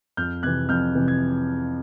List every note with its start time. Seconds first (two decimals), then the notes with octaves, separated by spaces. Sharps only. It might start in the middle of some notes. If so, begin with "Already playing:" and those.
0.17 F2 F6 G6
0.43 C3 E3 F#6 G#6
0.69 F2 F6 G6
0.95 C3 E3
1.08 G#6